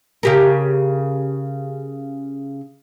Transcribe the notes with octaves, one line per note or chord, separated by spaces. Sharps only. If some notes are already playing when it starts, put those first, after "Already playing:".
C#3 G4 A#4